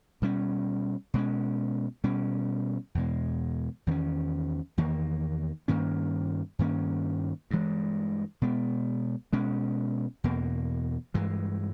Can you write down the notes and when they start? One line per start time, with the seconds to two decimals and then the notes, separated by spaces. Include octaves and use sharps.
0.22 B2 G3 C#4
1.14 B2 G#3 C#4
2.04 B2 G3 C#4
2.95 E2 B2 G#3
3.87 E2 D#3 A#3 C#4
4.78 E2 D#3 A#3
5.68 G2 D#3 A#3 C#4
6.59 G2 D#3 A#3 C#4
7.51 G2 E3 G#3
8.42 B2 G#3 B3
9.33 B2 G#3 C#4
10.24 E2 B2 A#3
11.14 G2 E3 G#3